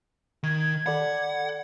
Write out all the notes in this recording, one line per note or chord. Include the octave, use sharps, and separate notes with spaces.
D#3 G#6
A4 D5 F#5 B5